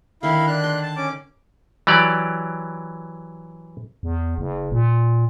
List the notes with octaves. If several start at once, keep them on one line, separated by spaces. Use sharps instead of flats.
D3 D#3 E4 F5
D4 F#6
C6
A5
C#4 D6
E3 F#3 G4 D5
E2
F#1
A#2